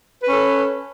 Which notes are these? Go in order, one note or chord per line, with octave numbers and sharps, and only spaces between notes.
C#4 A4 B4